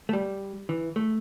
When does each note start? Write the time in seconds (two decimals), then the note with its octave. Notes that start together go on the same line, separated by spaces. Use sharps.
0.09 A3
0.13 G3
0.69 E3
0.96 A3